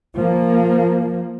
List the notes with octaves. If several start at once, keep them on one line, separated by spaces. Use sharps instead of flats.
F3 A#3